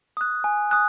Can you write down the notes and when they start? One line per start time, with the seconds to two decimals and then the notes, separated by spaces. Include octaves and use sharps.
0.17 D#6 F#6
0.44 G#5
0.71 D#6 F#6